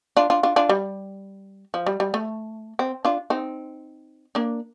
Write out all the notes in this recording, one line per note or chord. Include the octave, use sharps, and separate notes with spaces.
D4 F4
D4 F4
D4 F4
D4 F4
G3
F3
G3
G3
A3
C4
D4 F4
C4 D#4
A#3 D4